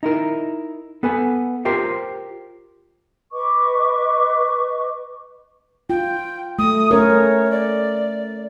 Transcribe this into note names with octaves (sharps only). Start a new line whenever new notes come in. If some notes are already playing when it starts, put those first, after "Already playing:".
D#4 E4 A#4
B3 A4 B4 F#5 G#5
F4 G4 A#4 C5 G5
B4 D#5 C#6 D6
F4 G5
A3 D#6
A3 C#4 A#4 C#5
D5